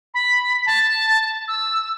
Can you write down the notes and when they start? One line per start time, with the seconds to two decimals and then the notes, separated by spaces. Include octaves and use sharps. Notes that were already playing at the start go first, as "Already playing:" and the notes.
0.14 B5
0.66 A5
1.48 E6